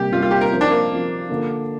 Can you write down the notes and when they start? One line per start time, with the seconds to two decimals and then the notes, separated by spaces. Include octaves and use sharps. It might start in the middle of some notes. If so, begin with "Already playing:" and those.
Already playing: C3 G3 A#3 G4
0.11 C3 G3 A#3 F4
0.22 F4
0.31 G4
0.41 A#4
0.52 F3 C4 A#4
0.61 D4
0.71 A#3
0.90 F3 C4 A#4
1.29 D3 A#3 F4